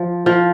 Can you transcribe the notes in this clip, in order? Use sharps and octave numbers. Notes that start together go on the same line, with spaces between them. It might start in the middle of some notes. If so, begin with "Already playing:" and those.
Already playing: F3
F3